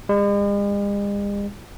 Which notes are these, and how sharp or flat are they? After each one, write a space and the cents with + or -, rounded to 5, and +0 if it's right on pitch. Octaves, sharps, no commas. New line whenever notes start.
G#3 -45